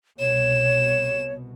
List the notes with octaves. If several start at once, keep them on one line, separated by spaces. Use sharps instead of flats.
C2 B2 C#5 E7